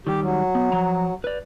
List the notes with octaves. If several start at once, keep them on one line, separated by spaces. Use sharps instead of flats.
D#3 G3 G4
F#3
B3
F3 A#5
B4 D5